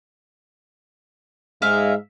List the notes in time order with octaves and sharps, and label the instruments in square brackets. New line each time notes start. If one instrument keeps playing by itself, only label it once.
[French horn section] G#2 G#3 [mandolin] E5 F5